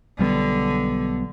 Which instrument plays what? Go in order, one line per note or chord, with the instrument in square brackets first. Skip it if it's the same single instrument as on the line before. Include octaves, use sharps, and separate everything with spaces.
[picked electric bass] B1 G3 B3 [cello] D3